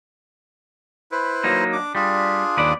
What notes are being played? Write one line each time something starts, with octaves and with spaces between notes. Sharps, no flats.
E4 B4 C5
F#3 A#3 D#4
D4 D6
G3 D4 F4 G#4
D#2 B4 D5